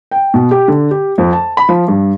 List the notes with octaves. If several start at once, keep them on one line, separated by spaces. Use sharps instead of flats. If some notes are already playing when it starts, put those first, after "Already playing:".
G5
B2
G4
D3
G4
F2
A5
B5
F3
G2